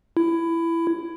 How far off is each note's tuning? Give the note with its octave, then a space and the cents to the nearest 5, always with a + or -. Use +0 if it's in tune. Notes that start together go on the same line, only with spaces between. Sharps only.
E4 +15